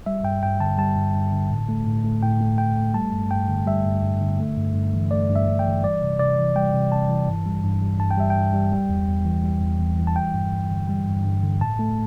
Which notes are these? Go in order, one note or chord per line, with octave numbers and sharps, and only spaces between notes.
G3 E5
G2 G5
G2 G5
D3 A5
G3 A5
G2
G2
D3
A2
A3
A2
A3
A2 G5
A3
A2 G5
A3
G3 A5
G2
G2 G5
D3
G3 E5
G2
G2
D3
A3
G2
G2
E3
A3 D5
G2
E5
G2
G5
E3
G3 D5
C3
C3 D5
E3
G3 G5
C3
C3 A5
E3
G2
G3
G2
G3
G2 A5
G5
G3 E5
G5
G2
G3
G3
E2
E2
E3
G3
E2
E2
E3
A5
G3 G5
G2
G2
D3
G3
G2
G2
D3
A2 A5
A3